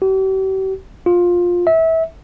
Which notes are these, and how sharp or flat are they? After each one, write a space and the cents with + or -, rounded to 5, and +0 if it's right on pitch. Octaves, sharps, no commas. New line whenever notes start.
G4 -45
F4 +15
E5 -25